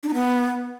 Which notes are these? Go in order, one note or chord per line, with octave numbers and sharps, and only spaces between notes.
D4
D#4
B3